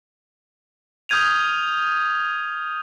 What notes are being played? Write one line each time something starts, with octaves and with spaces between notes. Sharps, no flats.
D#6 F6 G6 G#6 D#7 F7